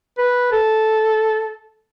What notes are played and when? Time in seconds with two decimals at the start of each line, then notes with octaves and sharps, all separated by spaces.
0.18 B4
0.52 A4